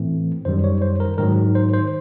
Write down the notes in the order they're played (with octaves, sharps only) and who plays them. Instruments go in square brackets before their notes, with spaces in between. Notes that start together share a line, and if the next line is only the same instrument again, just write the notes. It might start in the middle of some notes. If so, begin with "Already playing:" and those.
Already playing: [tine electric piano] A2 E3 A3 C4
F#2 D#3 G3 C5
C#5
C5
A#4
G#2 D#3 F#3 A#4
C5
C5